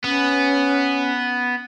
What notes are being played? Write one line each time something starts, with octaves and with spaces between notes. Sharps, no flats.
B3 C#4